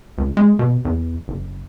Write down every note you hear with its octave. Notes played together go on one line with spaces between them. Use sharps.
C#2
G#3
B2
E2
F#1